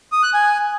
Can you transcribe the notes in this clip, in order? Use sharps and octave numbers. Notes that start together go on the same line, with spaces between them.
D#6
F#6
G#5